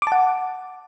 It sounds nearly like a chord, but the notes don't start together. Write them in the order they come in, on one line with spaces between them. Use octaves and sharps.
D6 A5 F#5